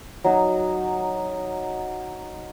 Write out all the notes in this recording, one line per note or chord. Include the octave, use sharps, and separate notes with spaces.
F#3 D#4 F#4 D#5